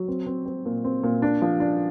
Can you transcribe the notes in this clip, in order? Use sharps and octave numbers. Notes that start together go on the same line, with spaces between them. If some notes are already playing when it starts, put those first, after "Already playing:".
Already playing: F#3
C4
C4
C4
A#2
C4
A#2
D4
F3
D4